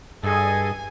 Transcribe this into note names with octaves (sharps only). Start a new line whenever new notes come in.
G2 G#4 A4 D#5 G#5